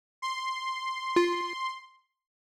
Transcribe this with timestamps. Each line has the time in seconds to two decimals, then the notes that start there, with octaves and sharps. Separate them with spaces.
0.22 C6
1.16 F4